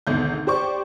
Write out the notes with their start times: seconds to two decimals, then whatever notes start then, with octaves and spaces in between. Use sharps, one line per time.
0.07 G#1 D2 B2 G6
0.47 G4 C5 D5 C#6